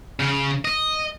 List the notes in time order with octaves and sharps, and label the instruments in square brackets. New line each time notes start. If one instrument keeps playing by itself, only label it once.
[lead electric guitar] C#3
D#5